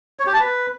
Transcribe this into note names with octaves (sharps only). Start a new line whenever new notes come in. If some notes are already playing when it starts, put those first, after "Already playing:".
C#5
G4
A5
B4